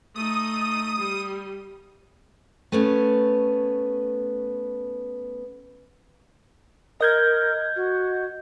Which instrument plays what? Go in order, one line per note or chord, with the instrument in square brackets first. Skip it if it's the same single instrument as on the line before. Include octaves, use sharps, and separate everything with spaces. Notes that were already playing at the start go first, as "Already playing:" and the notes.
[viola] A3 D#4 [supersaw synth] D#6 D#7
[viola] G3
[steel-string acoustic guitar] A3 B3 C#4
[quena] A#4 [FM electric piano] D#5 G6 G#6
[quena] F#4